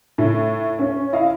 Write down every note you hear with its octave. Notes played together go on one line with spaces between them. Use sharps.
A2
C#4
E4 D#5 F5